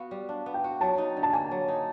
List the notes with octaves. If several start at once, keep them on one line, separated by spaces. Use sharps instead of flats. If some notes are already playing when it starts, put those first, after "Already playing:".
Already playing: B3 F#4 F5
G3
D4
B3
G5
F#4
F#3 A5
D#4
D3
A5
A#3 G#5
F#3
D#4